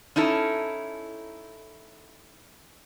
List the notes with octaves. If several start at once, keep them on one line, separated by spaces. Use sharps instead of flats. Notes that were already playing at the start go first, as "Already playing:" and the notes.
C#4 D#4 E4 A4